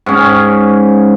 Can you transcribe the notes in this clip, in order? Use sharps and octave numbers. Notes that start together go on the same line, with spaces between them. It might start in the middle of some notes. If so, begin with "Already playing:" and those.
G#2 C#4